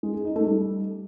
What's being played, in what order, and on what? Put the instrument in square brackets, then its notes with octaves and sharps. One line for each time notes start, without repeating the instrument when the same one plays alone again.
[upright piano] G#3
G#4
D#4
A3
G3